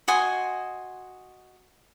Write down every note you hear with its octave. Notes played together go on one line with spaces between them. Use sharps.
F#4 D#5 G#5 C6